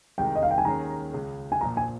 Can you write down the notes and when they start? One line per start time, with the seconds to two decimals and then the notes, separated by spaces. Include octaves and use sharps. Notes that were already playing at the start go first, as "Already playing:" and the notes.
0.18 C2 C3 D#3 G#3 G5
0.36 D#5
0.43 F5
0.51 G5
0.58 G#5
0.65 D#2 D#3 G#3 C#4 G#4 A#5
1.13 C#2 C#3 G#3
1.52 G#5
1.61 A#1 A#2 F3 A#3 A#5
1.77 G#5